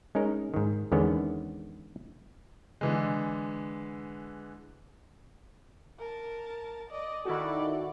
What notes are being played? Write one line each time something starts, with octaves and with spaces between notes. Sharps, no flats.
G#3 C#4 D#4 A#4
G#2 D#3
E2 D3 D#3 G#3 B3 C#4
D3 E3 G#3
A#4 A5
D5 D#5
D#3 E4 F#4 A4 D5